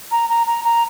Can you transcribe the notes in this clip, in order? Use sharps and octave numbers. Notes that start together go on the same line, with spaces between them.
A#5
A#5
A#5
A#5